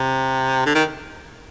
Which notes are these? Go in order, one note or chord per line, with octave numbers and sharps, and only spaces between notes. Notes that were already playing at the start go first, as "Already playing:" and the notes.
Already playing: C3
D3
D#3